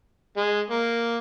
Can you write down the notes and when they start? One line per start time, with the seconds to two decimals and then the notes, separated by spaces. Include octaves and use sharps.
0.37 G#3
0.71 A#3